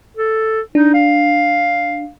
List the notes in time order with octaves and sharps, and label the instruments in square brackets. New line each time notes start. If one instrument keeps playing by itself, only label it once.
[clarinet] A4
[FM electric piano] D4 [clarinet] D#4
[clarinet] F5